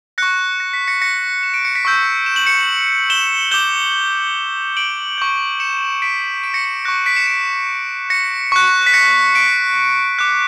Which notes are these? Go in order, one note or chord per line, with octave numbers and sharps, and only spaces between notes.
C#6 F#6 A#6 C#7
A#6
B6
A#6 C#7
A#6 C#7
E7
D7
C#7
B6 D7
C#6 E6 G6
E7
F#7
C#7 E7
E7 G7
D6 G6 E7 G7
D7 F#7
C#6 G6
C#7 E7
B6 D7
B6 D7
A#6 C#7
A#6
C#6 F#6 A#6
B6 D7
C#7 E7
B6 D7
A#6 C#7
C#6 F#6
B6
A#6 C#7
B6 D7
D6 F#6